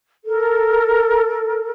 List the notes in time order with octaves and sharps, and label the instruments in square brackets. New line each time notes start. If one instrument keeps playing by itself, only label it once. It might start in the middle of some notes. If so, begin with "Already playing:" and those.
[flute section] A4 A#4